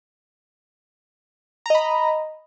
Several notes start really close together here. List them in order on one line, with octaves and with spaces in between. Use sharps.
A#5 D#5 B5